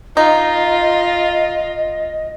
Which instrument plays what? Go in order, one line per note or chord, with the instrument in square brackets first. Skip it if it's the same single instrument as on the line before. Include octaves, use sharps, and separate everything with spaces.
[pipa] D#4 [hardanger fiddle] F4 [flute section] D#5